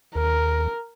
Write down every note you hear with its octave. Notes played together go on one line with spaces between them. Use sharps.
D#2 A#4